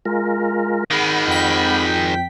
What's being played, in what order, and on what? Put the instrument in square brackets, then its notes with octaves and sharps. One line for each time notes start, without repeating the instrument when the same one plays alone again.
[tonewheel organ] G#3 F4 A#4
[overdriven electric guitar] D#3 G#3 [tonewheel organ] F#5 B5
[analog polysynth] F2 G5 B6